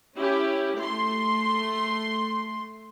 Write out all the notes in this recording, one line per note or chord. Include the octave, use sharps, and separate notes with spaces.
C#4 E4 G4
A3 C6